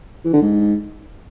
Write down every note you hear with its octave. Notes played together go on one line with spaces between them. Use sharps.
E3
D3
G#2